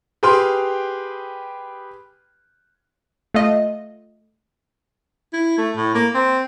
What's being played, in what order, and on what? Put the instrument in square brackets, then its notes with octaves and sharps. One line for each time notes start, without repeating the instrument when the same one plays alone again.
[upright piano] G4 G#4 B4 G5 C6 F6
[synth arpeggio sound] A3 F4 D#5
[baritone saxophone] E4
A3
A2
A#3
C4